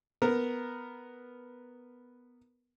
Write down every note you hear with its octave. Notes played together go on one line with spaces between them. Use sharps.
B3 A#4